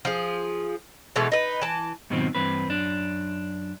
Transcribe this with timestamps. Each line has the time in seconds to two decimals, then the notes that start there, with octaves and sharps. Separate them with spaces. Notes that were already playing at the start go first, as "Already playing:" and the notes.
0.05 F3 G#4
1.16 B2 E3 G#3 A3
1.32 D#4 B4
1.62 E3 A5
2.10 G#2 B2 D#3 F3 F#3 C4
2.35 G2 E3 C4 B4
2.67 F#2 D4